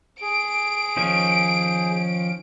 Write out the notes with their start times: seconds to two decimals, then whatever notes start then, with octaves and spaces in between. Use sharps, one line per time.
0.22 G#4 D7
0.97 D#3 F3 C#4